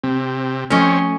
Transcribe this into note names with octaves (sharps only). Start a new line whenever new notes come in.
C3 C4
F3 A3 C4 C#4 C#5 D#5